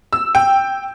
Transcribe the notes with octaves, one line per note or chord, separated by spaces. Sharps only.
E6
G5